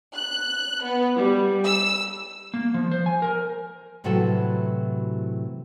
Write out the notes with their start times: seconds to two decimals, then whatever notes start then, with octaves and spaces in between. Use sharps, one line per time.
0.15 F#6
0.83 B3
1.15 G3
1.65 E6
2.54 A#3
2.74 F3
2.91 C5
3.06 G#5
3.22 A#4
4.04 A2 C3 E3 F#3 F#4 A4